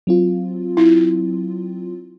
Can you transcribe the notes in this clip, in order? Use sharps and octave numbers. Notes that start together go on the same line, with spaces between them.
F#3 C4 F4
E4